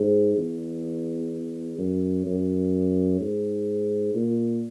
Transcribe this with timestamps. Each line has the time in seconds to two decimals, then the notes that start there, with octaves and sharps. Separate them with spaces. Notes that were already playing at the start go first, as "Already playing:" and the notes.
Already playing: G#2
0.38 E2
1.78 F#2
2.26 F#2
3.20 G#2
4.15 A#2